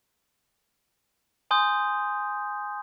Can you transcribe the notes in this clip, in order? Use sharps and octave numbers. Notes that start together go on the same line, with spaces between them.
G#5 C6 D#6 G6